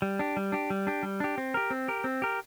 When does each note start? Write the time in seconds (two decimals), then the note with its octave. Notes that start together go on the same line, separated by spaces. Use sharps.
0.02 G3
0.19 D4 G4
0.37 G3
0.52 D4 G4
0.70 G3
0.87 D4 G4
1.03 G3
1.20 D4 G4
1.38 C4
1.54 G4 A#4
1.70 C4
1.88 G4 A#4
2.04 C4
2.22 G4 A#4